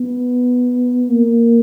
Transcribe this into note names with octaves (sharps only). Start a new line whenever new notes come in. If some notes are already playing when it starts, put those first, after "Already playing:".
Already playing: B3
A#3